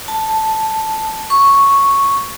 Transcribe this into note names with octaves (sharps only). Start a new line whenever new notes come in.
A5
C#6